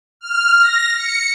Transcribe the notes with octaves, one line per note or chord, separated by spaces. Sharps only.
F6
A#6
C#7